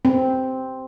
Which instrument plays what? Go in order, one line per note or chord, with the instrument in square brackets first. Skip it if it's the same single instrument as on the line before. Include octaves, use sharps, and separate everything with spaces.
[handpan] C4